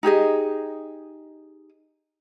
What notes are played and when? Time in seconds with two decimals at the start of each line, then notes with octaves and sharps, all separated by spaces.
0.03 D#4 G4 G#4 D#5